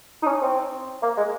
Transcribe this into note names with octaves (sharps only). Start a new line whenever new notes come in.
D#4
C#4
C4
A#3
G#3